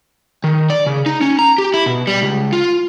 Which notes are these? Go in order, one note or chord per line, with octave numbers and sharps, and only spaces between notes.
D#3
D5
C#3
D#4
C#4
A#5
G4
E4
B2
G3
C#2
F4